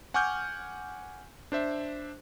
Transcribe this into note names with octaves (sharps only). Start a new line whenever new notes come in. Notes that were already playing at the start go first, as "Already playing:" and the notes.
F#5 G#5 C#6 D6 F6 G6
D4 C5 E5